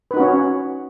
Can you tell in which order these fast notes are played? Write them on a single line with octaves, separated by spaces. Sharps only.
B4 D#4 F#4 C#4 C#5